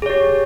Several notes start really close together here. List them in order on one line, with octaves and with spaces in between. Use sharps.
G#4 C#5 G4